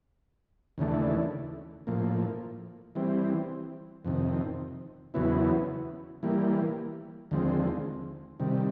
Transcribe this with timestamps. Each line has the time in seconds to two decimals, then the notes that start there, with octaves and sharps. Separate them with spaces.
0.78 D#2 C#3 E3 A3 D4
1.87 A2 F3 A#3
2.95 E3 G3 C4
4.05 F2 C3 D#3
5.14 E2 C#3 F#3 B3 E4
6.23 E3 G3 A#3
7.31 D#2 D3 F3 G#3 C4
8.40 C3 D#3 G3